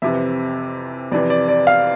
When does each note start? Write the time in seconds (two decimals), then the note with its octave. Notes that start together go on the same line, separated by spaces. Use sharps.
0.02 F2 C3 E3 E5
1.12 F2 C3 E3 D5
1.30 D5
1.48 D5
1.67 F5